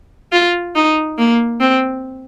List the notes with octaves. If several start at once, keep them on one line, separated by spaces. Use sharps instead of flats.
F4
D#4
A#3
C4